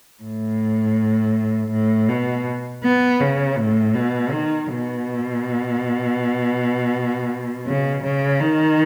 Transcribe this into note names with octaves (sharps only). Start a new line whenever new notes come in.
A2
A2
B2
B3
C#3
A2
B2
D#3
B2
C#3
C#3
D#3